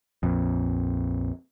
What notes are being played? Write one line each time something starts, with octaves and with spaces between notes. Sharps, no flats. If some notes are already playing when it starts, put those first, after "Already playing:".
A#1 F2